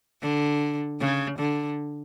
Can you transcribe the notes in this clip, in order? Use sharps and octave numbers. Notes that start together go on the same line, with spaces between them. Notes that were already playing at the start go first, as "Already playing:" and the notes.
D3
C#3
D3